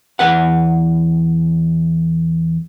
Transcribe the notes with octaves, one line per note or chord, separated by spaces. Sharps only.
E2 B4 F#5